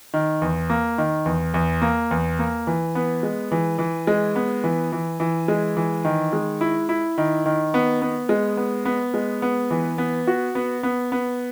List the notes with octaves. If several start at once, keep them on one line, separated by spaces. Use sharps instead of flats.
D#3
E2
A#3
D#3
E2
E2
A#3
E2
A#3
E3
B3
G#3
E3
E3
G#3
B3
E3
E3
E3
G#3
E3
D#3
G#3
E4
E4
D#3
D#3
B3
B3
G#3
B3
B3
G#3
B3
E3
B3
F#4
B3
B3
B3